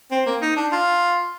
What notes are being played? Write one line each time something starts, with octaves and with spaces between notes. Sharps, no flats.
C4
A#3
D#4
D4
F4